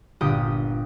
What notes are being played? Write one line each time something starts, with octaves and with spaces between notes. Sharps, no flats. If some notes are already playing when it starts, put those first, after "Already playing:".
G1 A#2 G4 G5 D#6